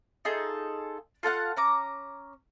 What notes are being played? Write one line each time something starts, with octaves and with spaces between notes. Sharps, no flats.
D#4 F4 G#4 A4
F4 A4 F5 F#5
C#4 A#5 D6